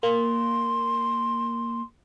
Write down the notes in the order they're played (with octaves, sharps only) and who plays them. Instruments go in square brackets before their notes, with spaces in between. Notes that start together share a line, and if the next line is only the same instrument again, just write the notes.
[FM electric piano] A#3 [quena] C6